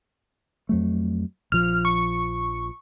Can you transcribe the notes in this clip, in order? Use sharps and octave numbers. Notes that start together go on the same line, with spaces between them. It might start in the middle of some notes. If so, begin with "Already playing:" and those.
F2 F#3 A3
A#1 F3 F6
C#6